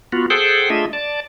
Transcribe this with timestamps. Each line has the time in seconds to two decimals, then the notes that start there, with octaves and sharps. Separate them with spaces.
0.12 B3 F4 F#4
0.30 G#4 A4 C5 F#5 G5
0.70 A3 D4 F4 G#4 D#5 E5
0.93 D5 A5